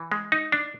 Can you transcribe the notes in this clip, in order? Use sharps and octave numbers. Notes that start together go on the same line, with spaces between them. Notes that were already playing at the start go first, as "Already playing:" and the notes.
Already playing: E3
G#3
D#4
D4